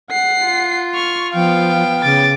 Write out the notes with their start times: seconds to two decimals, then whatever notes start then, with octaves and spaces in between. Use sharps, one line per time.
0.10 F#5 C7
0.41 F4
0.95 C#6 F6
1.34 F3 B3 F5 G5
2.03 C#3 D6 A6